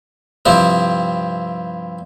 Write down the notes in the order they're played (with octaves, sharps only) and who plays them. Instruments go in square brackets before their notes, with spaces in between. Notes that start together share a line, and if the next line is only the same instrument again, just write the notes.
[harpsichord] G2 C3 F3 E4